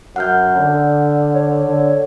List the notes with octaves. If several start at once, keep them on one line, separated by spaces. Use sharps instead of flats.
F#2 F#5 F6 G6
D3
C#5
D3